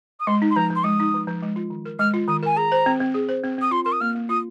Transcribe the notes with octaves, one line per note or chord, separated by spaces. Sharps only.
D#6
G#3 C6
D#4
C6
F3 A#5
F3
C6
G#3 D#6
D#4
F3
F3
G#3
F4
D#3
A#4
G#3 F6
F4
D#3 D#6
A#4 G#5
G#4 A#5
C5
C4
C4
G#4
C5
C4
C4 D#6
F4 C6
A#4 C6
D#6
A#3 F6
A#3
F4 D#6